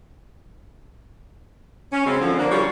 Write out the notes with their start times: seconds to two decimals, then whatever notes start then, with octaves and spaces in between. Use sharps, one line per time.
1.93 C#4
2.05 F#2 C#3 G#3 C4
2.21 D3 F3 C4
2.39 A#3 D4
2.51 C#3 G3 C#4 F4 F#4 C#5